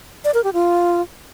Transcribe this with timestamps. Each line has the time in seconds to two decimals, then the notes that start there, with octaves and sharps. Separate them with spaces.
0.25 D5
0.34 A#4
0.44 G4
0.53 F4